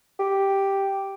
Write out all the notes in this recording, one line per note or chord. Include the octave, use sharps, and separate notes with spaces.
G4